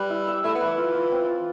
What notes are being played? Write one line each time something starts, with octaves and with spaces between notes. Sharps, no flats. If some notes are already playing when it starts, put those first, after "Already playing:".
Already playing: G3 B4
E4
E5
A3 E4
B3
B4
E3
F4
F4
C4
F4